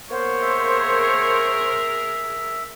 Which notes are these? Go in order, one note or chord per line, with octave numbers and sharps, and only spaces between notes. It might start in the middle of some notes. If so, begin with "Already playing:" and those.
A#3 B3 C5 C#5
G#4 A#4 E5